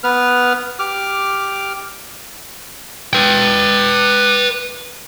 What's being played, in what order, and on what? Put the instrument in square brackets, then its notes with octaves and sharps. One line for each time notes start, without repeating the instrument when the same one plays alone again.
[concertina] B3 B4 F6
G4 D6 F6
[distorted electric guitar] B4 G5